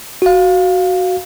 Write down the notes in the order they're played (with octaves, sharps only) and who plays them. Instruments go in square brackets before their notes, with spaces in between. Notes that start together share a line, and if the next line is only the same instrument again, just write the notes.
[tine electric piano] F#4 F5